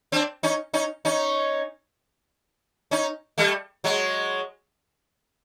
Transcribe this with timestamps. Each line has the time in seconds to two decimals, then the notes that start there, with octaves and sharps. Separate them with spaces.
0.12 C4 D4
0.43 C#4 D#4
0.73 C#4 D#4
1.05 C#4 D#4
2.91 C#4 D#4
3.38 G3 A3
3.84 F#3 G#3